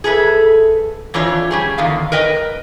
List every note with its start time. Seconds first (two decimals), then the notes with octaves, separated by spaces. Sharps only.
0.04 G#4 A4 B4 E5
1.14 F2 E3 D4 F4 C#5
1.51 G3 C#4 G#4
1.78 E2 D3 D#3 F5
2.12 A#4 B4 D#5 G5